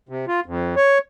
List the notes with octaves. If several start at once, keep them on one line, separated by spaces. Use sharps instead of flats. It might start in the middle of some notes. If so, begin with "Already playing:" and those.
C3
F4
F2
C#5